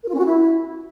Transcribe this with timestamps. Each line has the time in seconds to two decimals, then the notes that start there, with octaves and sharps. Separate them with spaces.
0.02 A#4
0.08 F4
0.13 C#4
0.19 F#4
0.24 E4